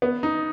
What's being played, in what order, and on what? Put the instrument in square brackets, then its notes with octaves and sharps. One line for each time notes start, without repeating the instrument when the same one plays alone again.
[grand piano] B3
D#4